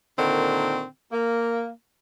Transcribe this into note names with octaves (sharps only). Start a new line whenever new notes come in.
A#2 D3 D#3 C4
A#3